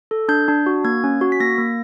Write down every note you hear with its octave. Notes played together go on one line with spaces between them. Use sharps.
A4
D4 G6
D4
F#4
A#3 G#6
C#4
F#4
B6
A#3 A#6
A#3